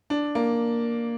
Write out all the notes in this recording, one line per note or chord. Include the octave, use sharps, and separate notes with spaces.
D4
A#3